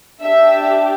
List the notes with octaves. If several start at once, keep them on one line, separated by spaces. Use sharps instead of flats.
D4 G4 E5